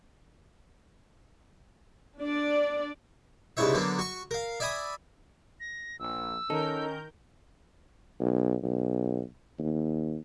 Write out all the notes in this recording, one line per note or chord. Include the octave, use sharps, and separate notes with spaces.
D4 D5
C2 G#2 C#3 E3 C#5 E5
D3 F#3 A#3 B3 D4
F#4 C#6
A#4 F5
D5 E5 G#5 B5 D#6
A#6
A#1 E6
D#3 C#4 D#4 A4 A#4 G6
B1
B1
D#2